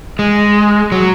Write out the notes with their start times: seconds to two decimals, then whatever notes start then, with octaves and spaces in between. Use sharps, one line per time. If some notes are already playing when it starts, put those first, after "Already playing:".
0.19 G#3
0.92 F#3